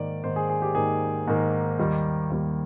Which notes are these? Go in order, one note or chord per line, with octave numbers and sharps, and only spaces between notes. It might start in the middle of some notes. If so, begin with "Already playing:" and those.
Already playing: G#2 D#3 A#3 D5
G#2 D#3 A#3 C5
G#4
G#4
G4
G#2 D#3 A#3 G#4
G#2 D#3 A#3
D#2 D#3 G3 A#3
D#2 D#3 G3 A#3